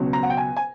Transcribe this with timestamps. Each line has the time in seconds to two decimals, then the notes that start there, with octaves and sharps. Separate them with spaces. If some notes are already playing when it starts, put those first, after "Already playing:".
Already playing: C#2 B2 F#3
0.13 A#5
0.23 F#5
0.30 G5
0.37 G#5
0.57 G#5